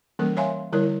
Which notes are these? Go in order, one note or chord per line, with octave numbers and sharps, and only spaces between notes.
E3 G3 A#3 C#4 A4 A#4
C#5 E5 F5 G#5 A#5 C6
D3 G3 E4 A#4 C#5